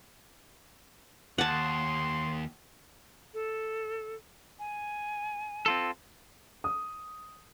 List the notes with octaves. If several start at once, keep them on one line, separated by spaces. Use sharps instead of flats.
D#2 F#5 A5 C6
A4
G#5
C4 F4 A4
D#6